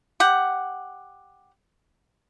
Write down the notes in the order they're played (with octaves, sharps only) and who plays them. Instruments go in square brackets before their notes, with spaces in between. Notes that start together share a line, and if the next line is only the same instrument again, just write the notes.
[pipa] G4 F#5